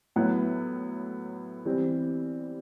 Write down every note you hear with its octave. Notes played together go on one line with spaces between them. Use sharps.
A2 F#3 B3 E4
E3 G3 C4